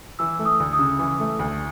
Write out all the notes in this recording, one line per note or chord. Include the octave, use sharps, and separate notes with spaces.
E3 E6
A3
D#6
D2
D#6
C#3
E3
A3
D2